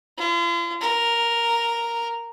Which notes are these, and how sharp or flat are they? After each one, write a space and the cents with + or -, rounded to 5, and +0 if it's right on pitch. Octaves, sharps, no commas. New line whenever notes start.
F4 -40
A#4 +0